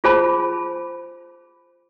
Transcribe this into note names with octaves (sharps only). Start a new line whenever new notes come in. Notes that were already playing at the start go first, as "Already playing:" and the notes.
F4 G#4 C5 A5 B5